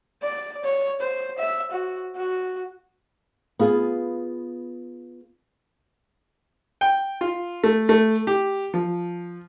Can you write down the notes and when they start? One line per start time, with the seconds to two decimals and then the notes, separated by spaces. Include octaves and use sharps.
0.23 D5
0.64 C#5
1.01 C5
1.39 E5
1.71 F#4
2.17 F#4
3.59 B3 F4 G#4
6.81 G5
7.21 F4
7.64 A3
7.89 A3
8.27 G4
8.74 F3